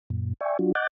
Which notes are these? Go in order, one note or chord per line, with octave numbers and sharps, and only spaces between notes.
F#2 A#2
D5 E5 G5 G#5 C#6
F#3 D4 F4 F#4
D#5 F#5 D6 F#6 G6 A6